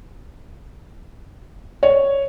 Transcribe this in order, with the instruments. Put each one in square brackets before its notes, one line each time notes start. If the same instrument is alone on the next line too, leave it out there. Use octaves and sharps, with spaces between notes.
[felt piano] C#5